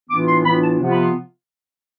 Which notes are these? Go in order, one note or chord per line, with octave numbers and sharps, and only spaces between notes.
A2 E3 B3 D4 F4 D6
C6
A2 E3 B3 D4 F4 B5
A5
C3 F3 B3 F4
B5
C6